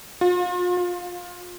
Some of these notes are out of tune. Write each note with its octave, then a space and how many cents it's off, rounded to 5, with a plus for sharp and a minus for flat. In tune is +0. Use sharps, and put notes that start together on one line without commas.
F4 +35
F4 +20